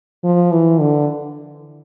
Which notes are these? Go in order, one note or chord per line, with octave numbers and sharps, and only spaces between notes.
F3
E3
D3